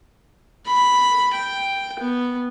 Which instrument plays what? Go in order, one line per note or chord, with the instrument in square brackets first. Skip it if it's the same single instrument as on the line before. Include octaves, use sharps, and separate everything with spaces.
[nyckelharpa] B5
G5
B3